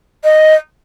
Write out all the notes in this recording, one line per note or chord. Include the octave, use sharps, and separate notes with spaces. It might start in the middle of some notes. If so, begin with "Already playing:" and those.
D#5